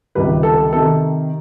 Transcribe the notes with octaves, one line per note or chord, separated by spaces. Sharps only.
C#2 C3 D#3 G3 B4
A4
C3 D#3 A4